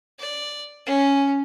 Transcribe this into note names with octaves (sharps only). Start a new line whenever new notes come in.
D5
C#4